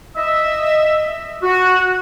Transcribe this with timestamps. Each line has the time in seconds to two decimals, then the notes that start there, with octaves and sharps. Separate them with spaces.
0.16 D#5 E5
1.43 F#4